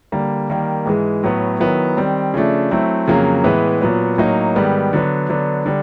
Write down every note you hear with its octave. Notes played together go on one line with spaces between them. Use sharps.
D3 G3 A#3
D#3 G3 A#3
G#2 E3 G#3
A2 F#3 B3
D#3 F#3 B3 E4
D#3 G3 C4
C#3 F3 A3 D4
F#3 A3 C4 E4
F2 C#3 F#3 A#3
A2 E3 G#3 B3
A#2 F#3 B3
A2 F#3 A#3 D#4
G#2 D#3 G3 B3
D3 F#3 B3
D3 F#3 B3 D4
D3 G3